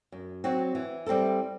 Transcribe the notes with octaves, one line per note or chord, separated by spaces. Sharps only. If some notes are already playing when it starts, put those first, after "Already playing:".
F#2
F#3 C4 F#4
E3
G3 C4 E4 A4